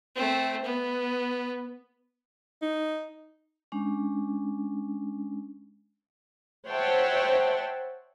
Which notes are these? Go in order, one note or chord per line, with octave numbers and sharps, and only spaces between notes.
A3 C4
B3
D#4
G#3 C#4 D4
C5 C#5 E5 F#5 G5 A5